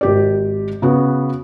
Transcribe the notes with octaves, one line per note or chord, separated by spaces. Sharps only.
G#1 G4 D5
C#3 B3 F#4